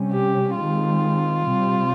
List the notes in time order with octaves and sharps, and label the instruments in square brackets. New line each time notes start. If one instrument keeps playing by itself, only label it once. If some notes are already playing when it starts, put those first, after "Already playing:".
Already playing: [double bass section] C3 G3 C#4
[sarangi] G4
[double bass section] D#3 G#3 C4 [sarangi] F4
[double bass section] C3 G3 C4